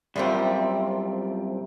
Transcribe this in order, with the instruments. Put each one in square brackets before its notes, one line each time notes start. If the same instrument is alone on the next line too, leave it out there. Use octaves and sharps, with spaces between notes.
[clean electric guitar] C2 F#2 F3 [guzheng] G3 A#3 C4